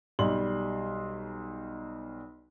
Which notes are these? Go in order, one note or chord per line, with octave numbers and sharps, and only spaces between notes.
B1 G3 C6 F#7